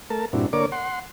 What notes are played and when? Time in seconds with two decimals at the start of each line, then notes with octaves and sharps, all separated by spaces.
0.10 A3 A#4 A5
0.33 G2 A#2 C4 D4 E4 F#4
0.53 D3 A#3 A#4 C#5 D5 D6
0.72 F#5 C6